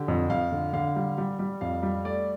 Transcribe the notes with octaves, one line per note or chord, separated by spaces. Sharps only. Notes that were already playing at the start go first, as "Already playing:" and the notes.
Already playing: D3 G4
F2
F2 F5
D3
D3 F5
G3
G3
G3
F2 F5
G3
A3 D5